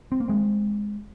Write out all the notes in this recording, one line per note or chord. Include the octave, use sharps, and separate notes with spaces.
C4
A#3
G#3 C4